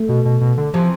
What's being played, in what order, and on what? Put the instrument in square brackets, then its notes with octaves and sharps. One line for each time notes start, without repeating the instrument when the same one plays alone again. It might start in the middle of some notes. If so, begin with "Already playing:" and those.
Already playing: [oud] A3
[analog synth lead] B2
B2
B2
D3
[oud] C3 E3 [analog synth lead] F3